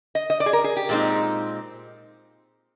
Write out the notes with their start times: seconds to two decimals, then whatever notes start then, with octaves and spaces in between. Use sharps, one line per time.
0.15 D#5
0.30 D#5
0.40 D5
0.46 G#4
0.53 A#4
0.64 G#4
0.77 G4
0.89 A#2 G#3 C4 D#4